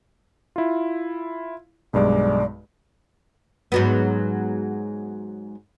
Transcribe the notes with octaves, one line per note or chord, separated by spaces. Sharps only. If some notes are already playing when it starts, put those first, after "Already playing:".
E4 F4
B1 G2 G#3 D5
G#2 F#3 B3